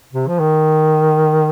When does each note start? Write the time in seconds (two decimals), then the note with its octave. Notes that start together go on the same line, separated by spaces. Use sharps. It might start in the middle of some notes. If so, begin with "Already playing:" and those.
0.13 C3
0.28 F3
0.40 D#3